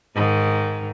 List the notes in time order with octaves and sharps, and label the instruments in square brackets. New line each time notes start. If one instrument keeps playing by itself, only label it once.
[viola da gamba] G#2 D#3